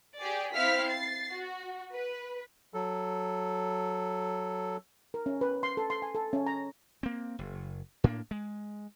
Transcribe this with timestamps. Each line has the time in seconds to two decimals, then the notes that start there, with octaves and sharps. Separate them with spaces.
0.19 G4 G#4 D5
0.54 C4 E4 F5 F6 B6
0.88 A6 C7
1.34 F#4
1.94 B4
2.74 F#3 A4
5.14 A#4
5.26 C#4
5.41 B4
5.63 C6
5.77 A4
5.90 C6
6.02 G#5
6.15 A4
6.33 C#4
6.46 A#5
7.03 A#3 C4
7.39 F#1
8.04 A2 A#3 D4
8.31 G#3